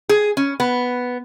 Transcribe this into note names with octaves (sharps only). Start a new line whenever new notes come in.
G#4
C#4
B3